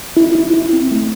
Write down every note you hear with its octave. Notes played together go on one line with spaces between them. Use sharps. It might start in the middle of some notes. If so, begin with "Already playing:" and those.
E4
E4
E4
C4
A3